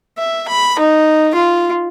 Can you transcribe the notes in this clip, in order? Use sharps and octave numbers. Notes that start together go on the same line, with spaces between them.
E5
B5
D#4
F4